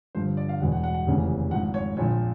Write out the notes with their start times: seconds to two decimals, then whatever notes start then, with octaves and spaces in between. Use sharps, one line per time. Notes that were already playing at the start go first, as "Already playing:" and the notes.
0.15 G1 G2 D3 F3 C5
0.37 D5
0.49 F5
0.60 E1 E2 B2 F#5
0.72 F#5
0.84 F#5
0.94 F#5
1.06 F1 D#2 C#3 E3
1.51 G#1 G#2 F3 F#5
1.74 C#5
1.97 A#1 A#2 F3 C#5